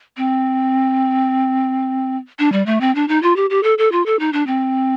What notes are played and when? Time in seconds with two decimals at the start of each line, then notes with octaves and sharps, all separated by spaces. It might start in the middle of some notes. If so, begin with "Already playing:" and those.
0.17 C4
2.39 D4
2.52 G3
2.66 A3
2.81 C4
2.95 D4
3.08 D#4
3.23 F4
3.36 G4
3.50 G4
3.63 A4
3.78 A4
3.92 F4
4.06 A4
4.19 D#4
4.33 D4
4.47 C4